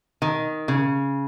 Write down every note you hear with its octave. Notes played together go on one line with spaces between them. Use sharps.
D#3
C#3